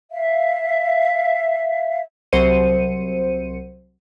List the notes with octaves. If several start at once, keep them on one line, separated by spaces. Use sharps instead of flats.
E5 F5
C2 F#3 C5 C#7 D#7